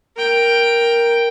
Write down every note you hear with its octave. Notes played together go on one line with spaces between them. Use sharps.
A#4 G5